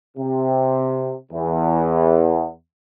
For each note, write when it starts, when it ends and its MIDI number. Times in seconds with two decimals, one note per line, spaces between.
0.17 1.13 48
1.32 2.48 40